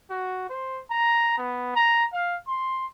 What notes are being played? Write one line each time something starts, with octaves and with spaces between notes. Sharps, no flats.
F#4
C5
A#5
B3
A#5
F5
C6